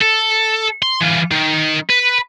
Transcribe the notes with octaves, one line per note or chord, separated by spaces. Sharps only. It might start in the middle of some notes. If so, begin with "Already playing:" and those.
A4
C6
E3 F4
D#3
B4